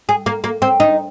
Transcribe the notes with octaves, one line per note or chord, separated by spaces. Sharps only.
G#4
A#3
A#3
C4
D#4